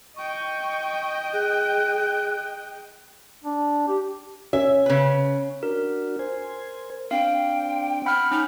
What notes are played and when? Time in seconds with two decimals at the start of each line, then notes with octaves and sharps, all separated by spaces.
0.16 D#5 G5 C#6
1.33 G#4 F#6
3.44 D4
3.88 G4
4.53 C#4 E5
4.86 C#3 B4
5.63 D4 F#4 A#4
6.19 C5 G#5
7.11 C4 D4 F5 G5
8.06 F#5 G5 B5 F6
8.31 C#4 D#4